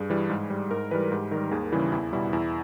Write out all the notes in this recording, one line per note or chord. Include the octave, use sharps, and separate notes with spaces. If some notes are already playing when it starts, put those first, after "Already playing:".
Already playing: G2 G#4
E3 G3
G#2
G3
G#2 A#4
E3 G3 B4
G#2 G4
D#3 G3 A#4
D#2 G#4
C#3 E3 G3 E4
E2 E4
B2 G3 E4
E2 E4